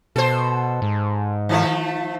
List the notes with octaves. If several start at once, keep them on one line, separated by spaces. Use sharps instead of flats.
B2 A4 C5
G#2
D#3 F3 A3